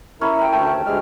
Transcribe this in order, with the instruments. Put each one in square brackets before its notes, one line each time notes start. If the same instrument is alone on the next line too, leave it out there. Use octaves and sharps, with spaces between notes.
[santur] C#4 A4 B5 [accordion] E4 A#4
[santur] G5 A#5
[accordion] D2 G5 A5 [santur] A3
[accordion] D#2
[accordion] D2 G#3 F6 [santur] G4 G#4